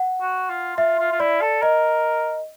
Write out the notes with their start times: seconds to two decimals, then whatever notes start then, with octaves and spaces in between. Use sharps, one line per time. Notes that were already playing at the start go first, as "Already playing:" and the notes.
Already playing: F#5
0.21 F#4
0.49 F4
0.77 F4 E5
0.99 F4
1.12 F4
1.20 E4 D5
1.41 A4
1.62 A#4 D#5